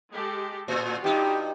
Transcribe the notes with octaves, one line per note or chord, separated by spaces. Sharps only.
G#3 G4 A4
A2 F4 F#4
G2 D#4 G4